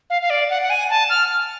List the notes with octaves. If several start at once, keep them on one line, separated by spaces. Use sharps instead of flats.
F5
F5
D5
F#5
F#5
G#5
A5
F6